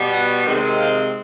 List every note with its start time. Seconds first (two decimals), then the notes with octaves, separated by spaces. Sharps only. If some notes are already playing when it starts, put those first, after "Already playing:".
Already playing: B2 G3 B3
0.12 F#5
0.45 C3 D#3 G#3 C4
0.78 F5